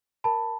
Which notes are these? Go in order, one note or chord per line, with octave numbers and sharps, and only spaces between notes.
A#4 A5 B5